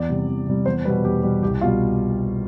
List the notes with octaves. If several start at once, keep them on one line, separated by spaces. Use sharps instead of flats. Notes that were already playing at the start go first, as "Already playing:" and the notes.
Already playing: E2 D5
C3 G3
E2
C3 G3
E2 C5
B2 G3 B4
E2 G4
B2 G3
C2 G4
B2 G3 F4